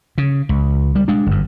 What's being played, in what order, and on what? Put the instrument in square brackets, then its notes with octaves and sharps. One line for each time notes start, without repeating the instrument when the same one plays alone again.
[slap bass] C#3
C#2
G3
G#3 D4
G1 F#2